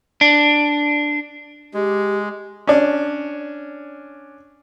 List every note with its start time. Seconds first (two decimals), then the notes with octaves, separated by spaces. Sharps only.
0.21 D4
1.74 G#3 G4
2.67 C#4 D4